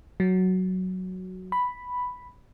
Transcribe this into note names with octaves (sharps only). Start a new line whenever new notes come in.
F#3
B5